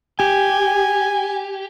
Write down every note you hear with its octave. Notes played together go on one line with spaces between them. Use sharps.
G4 G#5